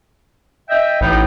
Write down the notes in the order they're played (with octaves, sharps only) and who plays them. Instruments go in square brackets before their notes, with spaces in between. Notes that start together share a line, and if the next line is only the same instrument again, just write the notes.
[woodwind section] D#5 E5 G5
[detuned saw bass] A1 [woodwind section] A2 D#4